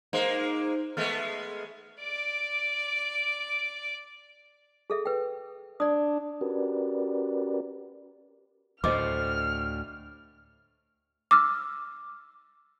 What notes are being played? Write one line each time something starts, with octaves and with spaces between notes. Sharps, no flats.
G#3 A#3 D#4 C5 D7
G#3 A3 B3 F6
D5 D6
G#4 A4 E5
B4 G5
D4 D5 D#6
C#4 F#4 G4 A#4 B4 D5
D2 A2 C5 D#5 D6 F6
D6 E6 F6